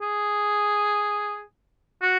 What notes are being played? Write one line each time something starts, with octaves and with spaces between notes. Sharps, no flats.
G#4
F#4